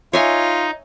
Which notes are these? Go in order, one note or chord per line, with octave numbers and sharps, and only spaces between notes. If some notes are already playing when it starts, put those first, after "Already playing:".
D#4 F4 C#5 E5 G#5